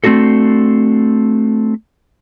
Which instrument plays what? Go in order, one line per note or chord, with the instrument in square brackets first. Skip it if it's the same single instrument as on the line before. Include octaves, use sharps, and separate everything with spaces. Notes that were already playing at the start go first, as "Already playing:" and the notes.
[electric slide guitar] A3 C4 D4 F#4 A4